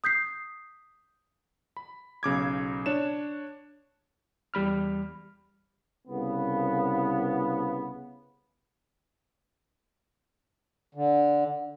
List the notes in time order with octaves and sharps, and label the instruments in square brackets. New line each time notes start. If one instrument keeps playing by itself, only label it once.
[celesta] D#6 G6 B6 C7
[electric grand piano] B5
B1 C#3 D6 G#6
D4 C#5 E7
[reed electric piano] E2 G3 B5 F6
[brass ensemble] C2 C#3 B3
[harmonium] D3